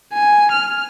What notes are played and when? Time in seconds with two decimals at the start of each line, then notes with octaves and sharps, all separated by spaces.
0.13 G#5
0.52 F6